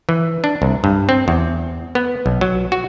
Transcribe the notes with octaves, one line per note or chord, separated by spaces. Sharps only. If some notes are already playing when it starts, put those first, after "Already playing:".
E3
D4
C2
G2
C4
E2
B3
B1
F#3
F#4